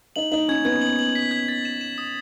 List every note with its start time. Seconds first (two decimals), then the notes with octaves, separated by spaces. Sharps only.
0.16 D#4 F#7
0.32 D#4 F#7
0.48 C#4 G#6
0.65 B3 G#6
0.81 F#7
0.99 F#7
1.15 B6
1.31 G#6
1.48 A6
1.65 E7
1.81 E7
1.98 D#6